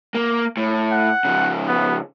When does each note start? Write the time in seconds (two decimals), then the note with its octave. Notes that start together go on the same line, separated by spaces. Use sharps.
0.15 A#3
0.57 A2
0.92 F#5
1.25 C#3 F3
1.68 B3